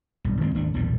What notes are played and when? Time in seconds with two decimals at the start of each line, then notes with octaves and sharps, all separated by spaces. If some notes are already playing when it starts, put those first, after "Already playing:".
0.24 B1 G2
0.40 D#3 G#3 A#3 C4
0.55 G#1 D#2 A3 D4
0.74 B1 E2 G2 A#2